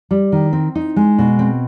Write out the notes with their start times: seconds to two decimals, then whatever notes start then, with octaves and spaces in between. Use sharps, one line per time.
0.11 G3
0.32 D#3
0.53 C4
0.75 D#4
0.96 G#3
1.18 B2
1.39 C4